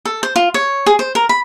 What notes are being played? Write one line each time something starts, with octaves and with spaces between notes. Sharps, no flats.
A4
C5
F4
C#5
G#4
C5
A#4
B5